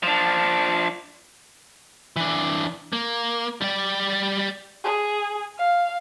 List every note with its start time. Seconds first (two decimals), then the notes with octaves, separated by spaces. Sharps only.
0.03 F3 D4
2.16 E3 D4
2.93 A#3
3.61 G3 D5
4.84 G#4
5.58 F5